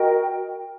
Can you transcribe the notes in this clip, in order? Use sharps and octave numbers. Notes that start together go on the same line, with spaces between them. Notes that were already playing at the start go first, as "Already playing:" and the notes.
Already playing: F#4 A#4 D#5 G5